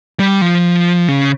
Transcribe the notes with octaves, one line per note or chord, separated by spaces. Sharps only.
G3
F3
C#3